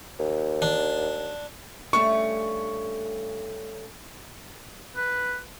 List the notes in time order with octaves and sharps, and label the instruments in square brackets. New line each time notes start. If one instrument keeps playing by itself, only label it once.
[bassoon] D#2
[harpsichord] D4
[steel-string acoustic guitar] G2 A3 C#4 [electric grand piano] C#6
[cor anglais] B4